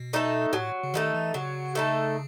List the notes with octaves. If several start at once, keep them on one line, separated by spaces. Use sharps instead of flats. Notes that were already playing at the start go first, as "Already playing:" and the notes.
Already playing: B2
A3 D#4 A4
A2 F#3
C#3
D#3 A3 D#4 A4
E3
C#3 F#3
A3 D#4 A4